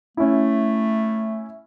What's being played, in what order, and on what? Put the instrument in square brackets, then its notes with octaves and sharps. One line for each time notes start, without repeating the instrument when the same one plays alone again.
[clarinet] A3 [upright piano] C#4 E4